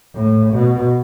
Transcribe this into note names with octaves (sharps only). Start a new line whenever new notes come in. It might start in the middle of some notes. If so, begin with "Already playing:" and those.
A2
B2